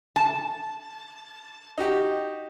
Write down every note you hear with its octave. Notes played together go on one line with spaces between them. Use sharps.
A5
D#4 F#4 G4